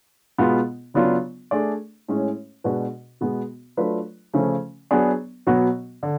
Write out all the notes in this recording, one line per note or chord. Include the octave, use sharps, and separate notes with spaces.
B2 G#3 B3 F4
C#3 F#3 B3 D4 F4
A3 D4 G#4 D5
A2 G#3 C#4
B2 G#3 D4 F#4 B4
B2 G#3 B3 F#4
F#3 A3 D4 F4 B4
C#3 F3 A3 C#4
F#3 B3 D4 G#4
B2 F#3 B3 F#4
D3